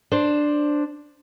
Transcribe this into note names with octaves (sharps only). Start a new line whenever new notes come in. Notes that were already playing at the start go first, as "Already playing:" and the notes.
D4 C5